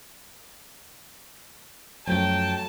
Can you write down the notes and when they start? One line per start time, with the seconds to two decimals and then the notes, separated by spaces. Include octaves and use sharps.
2.07 F#2 F3 F#3 A3 G5 A5